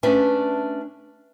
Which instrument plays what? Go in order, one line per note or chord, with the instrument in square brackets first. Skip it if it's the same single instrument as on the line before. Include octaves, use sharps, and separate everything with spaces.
[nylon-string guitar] A3 C#4 D4 B4 E5 A5